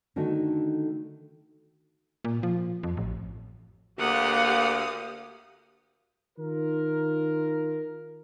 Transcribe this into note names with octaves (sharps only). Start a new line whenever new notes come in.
D3 D#3 A3 D4 F#4
A#2
F3
F2
A1
D2 A#3 G4 F5 F#5 D#6
D#3 F4 A#4